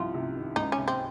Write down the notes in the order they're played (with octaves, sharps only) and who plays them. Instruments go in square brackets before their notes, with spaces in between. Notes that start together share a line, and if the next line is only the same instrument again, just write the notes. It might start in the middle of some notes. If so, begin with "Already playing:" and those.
Already playing: [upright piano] C2 F3 [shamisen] F4
[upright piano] C3
D#3
[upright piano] C#2 [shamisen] D#4
[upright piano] C3 [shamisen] C#4
[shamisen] C4